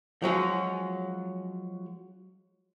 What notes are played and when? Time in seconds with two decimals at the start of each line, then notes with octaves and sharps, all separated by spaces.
0.22 F3 F#3 G#3 C#4